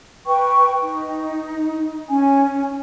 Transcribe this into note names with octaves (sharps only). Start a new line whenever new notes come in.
B4 G5 C#6
D#4
C#4 G#5